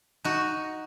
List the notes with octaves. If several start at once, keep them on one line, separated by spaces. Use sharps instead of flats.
D#4 F#4